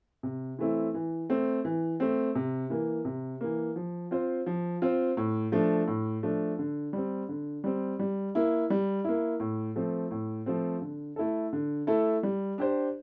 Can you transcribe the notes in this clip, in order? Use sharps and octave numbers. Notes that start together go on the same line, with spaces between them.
C3
E3 A3 C4 E4
E3
A3 C4
E3
A3 C4
C3
E3 A#3
C3
E3 A#3
F3
C4 F4 C5
F3
C4 F4 C5
A2
F3 A3 D4
A2
F3 A3 D4
D3
G3 C4
D3
G3 C4
G3
A#3 E4
G3
A#3 E4
A2
F3 A3 C4
A2
F3 A3 C4
D3
A3 E4 A4
D3
A3 E4 A4
G3
D4 G4 C5